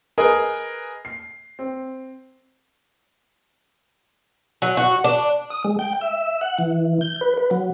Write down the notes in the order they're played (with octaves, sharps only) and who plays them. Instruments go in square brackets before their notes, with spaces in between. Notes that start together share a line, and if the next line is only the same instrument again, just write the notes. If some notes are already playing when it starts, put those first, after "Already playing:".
[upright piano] G#4 A#4 B4 D#5
C7
C4
[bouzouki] F#3
F#4
D4
[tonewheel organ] D#6
G#3
G5
E5
F#5
E3
G6
B4
B4
F#3